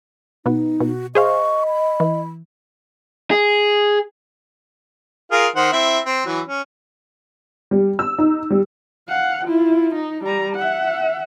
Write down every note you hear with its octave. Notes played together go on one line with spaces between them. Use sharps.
B2 B3 D#4
B2 F#4
G#4 C5 D#5 F5 C#6
B5
E3
G#4
F4 G#4 A#4
D#3 C5 F#5
C4 E4 E5
C4
E3 F#3
C#4
G3
E6
D#4
G3
F5 F#5
E4 F4
D#4
G3 A#5
E5 F#5